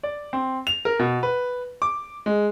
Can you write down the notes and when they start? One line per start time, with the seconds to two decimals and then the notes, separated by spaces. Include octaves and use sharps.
0.03 D5
0.33 C4
0.67 F7
0.85 A#4
0.99 B2
1.23 B4
1.82 D6
2.26 G#3